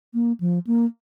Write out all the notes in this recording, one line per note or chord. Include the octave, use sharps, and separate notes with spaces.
A#3
F3
A#3